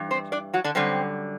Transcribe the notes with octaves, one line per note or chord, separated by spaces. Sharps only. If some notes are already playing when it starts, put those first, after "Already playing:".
Already playing: G2 E3
C4 C5
D4 D5
F#3 F#4
D3 D4
F#2 D3 G3 C4